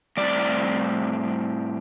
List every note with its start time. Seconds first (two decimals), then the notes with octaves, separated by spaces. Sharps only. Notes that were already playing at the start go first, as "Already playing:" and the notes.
0.17 A2 G3 C4 D5